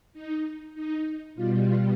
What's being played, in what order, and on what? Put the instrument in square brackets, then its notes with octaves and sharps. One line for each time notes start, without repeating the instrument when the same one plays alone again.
[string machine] D#4
D#4
B2 G3 F4
F4